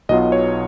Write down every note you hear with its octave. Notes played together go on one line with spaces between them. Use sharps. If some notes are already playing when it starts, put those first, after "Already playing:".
B1 B2 F#3 B3 F4 D#5
C#5